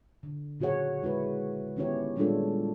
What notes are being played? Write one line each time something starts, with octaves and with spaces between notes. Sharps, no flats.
D3
A#2 C#3 F#4 G#4 C#5 F#5
G#3 E4 F#4 B4
D#3 B3 C#4 E4 G4 C#5
A#2 G3 G#3 D4 F4 A4